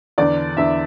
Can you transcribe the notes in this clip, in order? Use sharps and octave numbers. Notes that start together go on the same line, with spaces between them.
E2 D3 D5
E2 D3 E5